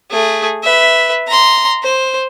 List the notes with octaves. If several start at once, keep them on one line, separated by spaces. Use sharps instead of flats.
A3 G#4
B4 E5
A#5 C6
C5